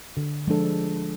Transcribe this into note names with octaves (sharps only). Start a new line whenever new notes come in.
D3
F3 G#3 D4 A4